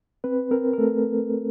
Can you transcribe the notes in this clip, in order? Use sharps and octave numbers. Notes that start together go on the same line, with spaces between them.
C4 B4
C4 A#4
A#4
A3 A4